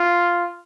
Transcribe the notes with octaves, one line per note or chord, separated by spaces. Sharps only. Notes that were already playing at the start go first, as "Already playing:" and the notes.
Already playing: F4